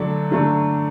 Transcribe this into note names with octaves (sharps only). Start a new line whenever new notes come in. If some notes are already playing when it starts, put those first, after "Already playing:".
Already playing: D3 F#3 A3 D4
D3 F#3 A3 D4